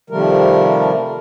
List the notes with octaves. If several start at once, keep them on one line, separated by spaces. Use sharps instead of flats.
C3 D#3 F3 G3 A3 A#4